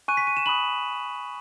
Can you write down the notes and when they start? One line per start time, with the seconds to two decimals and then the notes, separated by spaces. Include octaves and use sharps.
0.08 G#5 C#6 F#6 D#7
0.17 B6
0.27 D#7
0.37 E7
0.46 B5 D#6 F#6 F#7